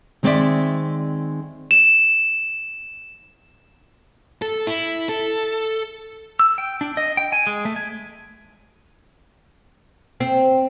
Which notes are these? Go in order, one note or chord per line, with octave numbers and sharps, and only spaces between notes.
D#3 G#3 C4 C#4 D5 E5
E7
A4
E4
A4
E6
G5
D4
D#5
G5
G#5
G#3
A3
G#5
C4